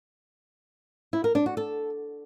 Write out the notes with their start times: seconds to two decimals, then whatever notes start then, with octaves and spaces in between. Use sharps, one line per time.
1.13 E4
1.24 A#4
1.35 D4
1.46 F#4
1.57 A4